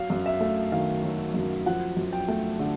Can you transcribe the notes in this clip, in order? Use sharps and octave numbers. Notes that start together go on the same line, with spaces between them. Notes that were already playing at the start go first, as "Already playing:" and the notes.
Already playing: F#3 F5
F#2
E5
A3
D#3 F5
F#3
F#2
F3 F#5
F#2
G5
A3
D3